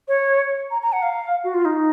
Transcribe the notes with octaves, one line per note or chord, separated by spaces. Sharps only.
C#5
A#5
A#5
F#5
F5
F#4
F4
D#4